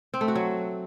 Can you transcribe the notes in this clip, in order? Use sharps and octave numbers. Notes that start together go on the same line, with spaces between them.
C4
A3
F#4
F#3